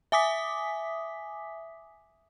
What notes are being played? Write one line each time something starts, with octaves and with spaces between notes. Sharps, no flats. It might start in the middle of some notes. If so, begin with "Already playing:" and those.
E5 G#5 D6 D#6 B6